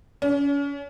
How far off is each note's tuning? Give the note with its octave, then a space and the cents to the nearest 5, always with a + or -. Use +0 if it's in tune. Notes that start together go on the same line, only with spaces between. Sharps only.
C#4 +35